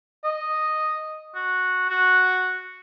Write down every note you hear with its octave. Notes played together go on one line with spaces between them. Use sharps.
D#5
F#4
F#4